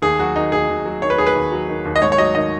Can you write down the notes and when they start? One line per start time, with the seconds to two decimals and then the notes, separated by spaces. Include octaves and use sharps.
0.02 D#2 G#4
0.19 F#3 F#4
0.36 D#3 D#4
0.52 D#2 G#4
0.69 D#2
0.85 F#3
1.02 D#3 C#5
1.10 B4
1.18 D#2 G#4
1.27 B4
1.36 D#2
1.52 F#3
1.69 D#3
1.85 D#2
1.96 D#5
2.02 G#2 C#5
2.12 C#5
2.18 F#3 D#5
2.35 D#3 D#5